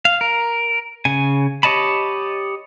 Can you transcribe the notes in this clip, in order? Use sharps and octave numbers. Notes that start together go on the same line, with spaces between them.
F5
A#4
C#3 G#5
G4 C#5 D#5 A5 B5